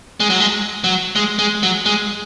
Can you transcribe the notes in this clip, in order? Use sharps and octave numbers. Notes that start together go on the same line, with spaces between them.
G#3
F#3
G#3
F#3
G#3
G#3
F#3
G#3